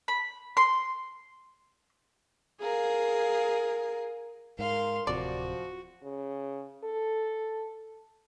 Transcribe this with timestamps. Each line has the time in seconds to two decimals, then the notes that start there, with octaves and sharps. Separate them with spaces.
0.08 B5
0.57 C6
2.61 G#4 A#4 F5
4.59 G#2 A#4 F5 C6
5.07 D1 C3 F3 F#4 D5
6.03 C#3
6.84 A4